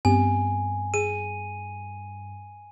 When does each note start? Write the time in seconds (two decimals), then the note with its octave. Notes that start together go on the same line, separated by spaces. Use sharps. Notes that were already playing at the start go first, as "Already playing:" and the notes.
0.05 G2 B3 C4 G4 G#5
0.94 G#4 D#7